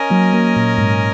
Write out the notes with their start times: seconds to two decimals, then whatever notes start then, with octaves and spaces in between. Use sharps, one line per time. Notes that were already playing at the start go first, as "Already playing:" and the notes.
Already playing: C#4 A#4 D#5 G#5
0.10 F#3 A#3
0.33 F#3 A#3
0.56 A#2
0.78 G#2